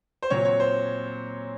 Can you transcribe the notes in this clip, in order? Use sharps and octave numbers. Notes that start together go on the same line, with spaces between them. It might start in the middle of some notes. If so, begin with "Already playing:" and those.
C5
A#2 F#3 C4 C#5
C#5
C5